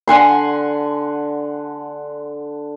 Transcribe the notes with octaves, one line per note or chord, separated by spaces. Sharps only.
D3 F#5 G#5 C6